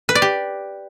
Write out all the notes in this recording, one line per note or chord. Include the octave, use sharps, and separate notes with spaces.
B4
D5
G4